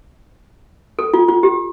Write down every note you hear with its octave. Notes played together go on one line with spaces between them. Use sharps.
A4
F4
F4
G4